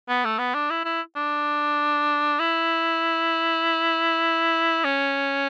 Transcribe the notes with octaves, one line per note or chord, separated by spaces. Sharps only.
B3
A3
B3
D4
E4
E4
D4
E4
C#4